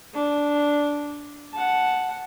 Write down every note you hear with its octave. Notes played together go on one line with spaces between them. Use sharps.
D4
F#5 A5